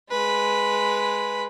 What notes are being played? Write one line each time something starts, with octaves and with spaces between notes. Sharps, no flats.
G#3 B4